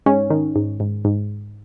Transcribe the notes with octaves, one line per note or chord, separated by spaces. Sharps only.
G#2 C#4
D#3
G#2
G#2
G#2